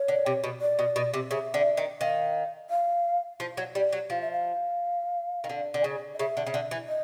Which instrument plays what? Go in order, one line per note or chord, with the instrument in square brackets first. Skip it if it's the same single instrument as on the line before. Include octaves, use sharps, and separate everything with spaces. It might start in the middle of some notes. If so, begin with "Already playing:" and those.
Already playing: [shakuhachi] C#5
[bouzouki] D3
C3
B2
[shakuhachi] D5
[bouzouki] B2
B2
C3
[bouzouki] C#3 [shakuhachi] E5
[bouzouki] D3
D#3
[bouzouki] D#3 [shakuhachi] F5
[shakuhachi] F5
[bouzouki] F3
F#3
G3
F#3
[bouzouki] F3 [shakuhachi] F5
[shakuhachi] E5
F5
[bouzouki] D#3
D3
D3
C#3
[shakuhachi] D#5
[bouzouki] C#3 [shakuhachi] E5
[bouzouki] D3
C#3
D3
E3
[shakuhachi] D#5